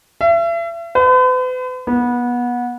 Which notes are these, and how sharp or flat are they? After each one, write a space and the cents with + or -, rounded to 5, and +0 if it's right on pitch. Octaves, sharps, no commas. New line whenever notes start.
E5 +40
B4 +45
B3 -25